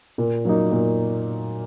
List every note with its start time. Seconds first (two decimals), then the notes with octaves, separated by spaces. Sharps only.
0.18 A#2
0.45 F#3 A#3 D#4
0.72 A#2